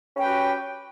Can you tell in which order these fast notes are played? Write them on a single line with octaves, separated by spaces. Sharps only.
C#4 G5 B4 G4 F#4